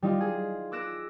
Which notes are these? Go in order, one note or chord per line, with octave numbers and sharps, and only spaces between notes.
G3 D#4 F4
G#4
D6 E6 F#6 A#6 D7 E7